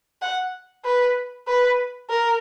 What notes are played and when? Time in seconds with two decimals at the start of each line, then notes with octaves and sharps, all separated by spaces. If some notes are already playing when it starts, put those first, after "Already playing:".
0.22 F#5
0.85 B4
1.47 B4
2.09 A#4